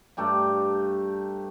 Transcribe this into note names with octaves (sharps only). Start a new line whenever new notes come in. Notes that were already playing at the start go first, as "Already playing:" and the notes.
G2 A3 G4 A#5